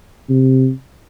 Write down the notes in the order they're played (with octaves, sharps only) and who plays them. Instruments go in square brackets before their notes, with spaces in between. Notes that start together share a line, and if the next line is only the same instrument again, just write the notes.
[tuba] C3